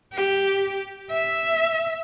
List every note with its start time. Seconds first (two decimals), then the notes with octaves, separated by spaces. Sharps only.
0.13 G4
1.10 E5